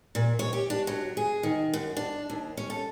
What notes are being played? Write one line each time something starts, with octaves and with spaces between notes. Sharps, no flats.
A#2
C#5
G4
D4
F#3
G#4
D#3
F#2
D4
D#2
C#4
A4